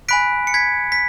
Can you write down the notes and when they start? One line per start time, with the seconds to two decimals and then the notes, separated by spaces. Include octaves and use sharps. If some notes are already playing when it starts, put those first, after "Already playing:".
0.09 G#5 B5 F#6 B6 D7
0.47 C#7
0.54 G#6 B6
0.92 B6